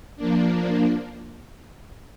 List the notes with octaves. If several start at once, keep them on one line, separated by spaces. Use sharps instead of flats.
F3 A#3 D4